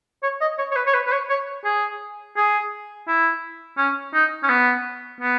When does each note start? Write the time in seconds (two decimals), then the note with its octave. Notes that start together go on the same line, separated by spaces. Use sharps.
0.23 C#5
0.41 D#5
0.58 C#5
0.71 C#5
0.76 B4
0.87 C#5
0.94 B4
1.07 B4
1.12 C#5
1.29 C#5
1.65 G#4
2.37 G#4
3.07 E4
3.78 C#4
4.14 D#4
4.43 C#4
4.49 B3
5.21 B3